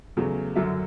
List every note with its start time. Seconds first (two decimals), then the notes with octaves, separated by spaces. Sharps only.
0.17 E2 C#3 F#3 A3
0.56 F#2 D3 F#3 E5